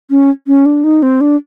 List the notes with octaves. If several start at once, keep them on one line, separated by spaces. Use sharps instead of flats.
C#4
C#4
D4
D#4
C4
D4